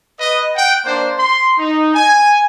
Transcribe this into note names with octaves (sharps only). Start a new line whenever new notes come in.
B4 D#5
F#5 G5
A#3 D4 C5
C6
D#4
G#5